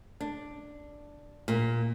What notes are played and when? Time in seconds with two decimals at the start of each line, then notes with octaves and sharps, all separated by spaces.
0.21 D4
1.48 A#2